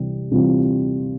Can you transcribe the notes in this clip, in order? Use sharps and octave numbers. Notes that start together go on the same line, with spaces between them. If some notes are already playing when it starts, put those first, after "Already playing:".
Already playing: C3 E3 G3 C4
C3 E3 G3 C4 F4